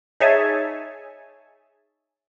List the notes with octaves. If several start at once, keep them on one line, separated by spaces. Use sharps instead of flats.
D#4 G#4 C#5 E5 G#5 A5